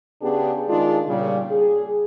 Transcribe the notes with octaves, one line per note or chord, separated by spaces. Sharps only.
C#3 B3 D4 G4 G#4
D#3 G#3 D4 D#4 F4 G#4
A#2 C#3 G3
G#4